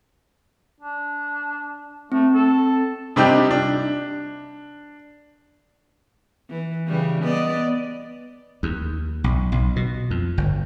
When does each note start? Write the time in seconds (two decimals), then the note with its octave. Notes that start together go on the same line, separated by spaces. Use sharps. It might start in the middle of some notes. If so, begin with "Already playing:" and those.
0.81 D4
2.12 A3 C4
2.34 A4
3.16 C3 G3 D4 D#4 G4
3.51 D4
6.50 E3
6.88 C#3 E3 G3
7.23 B3 D5 D#5
8.63 D#2
9.24 B1
9.52 B1
9.76 B2
10.10 F2
10.38 G1